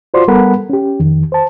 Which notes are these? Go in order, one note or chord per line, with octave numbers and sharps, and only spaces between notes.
F4 F#4 C5 D5 C6
G3 B3 A4 A#4 F#5 B5
C#4 G4
F2 D#3
C5 A5